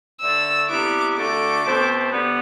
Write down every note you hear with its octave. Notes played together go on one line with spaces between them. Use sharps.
D3 A3 D4 E6
C3 G3 B3 E4 D6
D2 D3 A3 D6
B2 A3 C4
D3 G3 B3